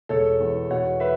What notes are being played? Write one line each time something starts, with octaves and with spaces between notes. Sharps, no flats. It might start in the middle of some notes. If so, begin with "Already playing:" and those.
E1 A4 C#5
E2
B2 C#5 F#5
B4 E5